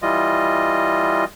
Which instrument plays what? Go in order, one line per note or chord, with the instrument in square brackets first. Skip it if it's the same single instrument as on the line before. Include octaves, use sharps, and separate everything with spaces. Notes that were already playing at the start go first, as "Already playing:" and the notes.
[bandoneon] E3 G3 F4 D#5